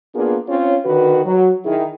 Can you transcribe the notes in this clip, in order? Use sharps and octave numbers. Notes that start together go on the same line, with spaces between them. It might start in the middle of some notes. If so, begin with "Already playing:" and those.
A#3 B3 D4 F4 G#4 A#4
C4 C#4 F4 C#5
D3 D#3 F#4 B4
F#3
D#3 E4 G#4